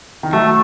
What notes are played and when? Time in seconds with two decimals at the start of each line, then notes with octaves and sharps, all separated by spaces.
0.23 D#3
0.33 F#3 A3